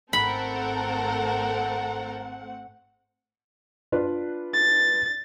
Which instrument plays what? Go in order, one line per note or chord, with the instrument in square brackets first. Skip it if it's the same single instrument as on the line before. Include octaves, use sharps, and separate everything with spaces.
[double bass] G#1 [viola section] A3 C4 F#5 [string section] A4 A#4 [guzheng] B5
[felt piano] D4 F4 B4
[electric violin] A6